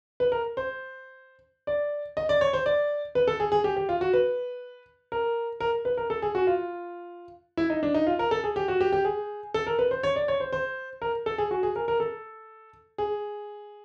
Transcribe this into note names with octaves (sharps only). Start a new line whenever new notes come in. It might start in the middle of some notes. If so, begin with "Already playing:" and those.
B4
A#4
C5
D5
D#5
D5
C#5
C5
D5
B4
A4
G#4
G#4
G4
G4
F4
F#4
B4
A#4
A#4
B4
A#4
A4
G#4
F#4
F4
E4
D#4
D4
D#4
F4
A#4
A4
G#4
G4
F#4
G4
G4
G#4
A4
A#4
B4
C5
C#5
D5
C#5
C5
C5
A#4
A4
G#4
F#4
G#4
A#4
A#4
A4
G#4